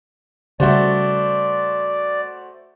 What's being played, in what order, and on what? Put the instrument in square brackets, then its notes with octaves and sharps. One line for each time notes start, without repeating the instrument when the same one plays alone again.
[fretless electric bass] C#3 G3 [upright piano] A3 F#4 C5 [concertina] D5